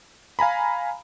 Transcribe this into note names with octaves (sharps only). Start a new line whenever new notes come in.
F5 G#5 A#5 B5